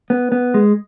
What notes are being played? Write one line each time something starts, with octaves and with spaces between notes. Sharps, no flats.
B3
B3
G#3